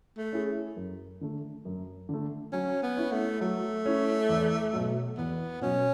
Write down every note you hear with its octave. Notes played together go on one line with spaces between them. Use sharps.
A3
C#4 E4 G#4
F#2
D3 A3
F#2
D3 A3
F#3 C#4
B3
C#4 E4
A3
F#3 A3
C#4 E4
E2
B2 F#3
E2 B3
B2 F#3 C#4